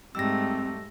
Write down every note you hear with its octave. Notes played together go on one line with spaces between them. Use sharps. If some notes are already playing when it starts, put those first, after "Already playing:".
G#2 G3 A3 C4 E6 A#6